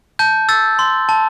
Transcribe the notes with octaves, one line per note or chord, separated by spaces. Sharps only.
A5 G6
E6 A6
C6
A5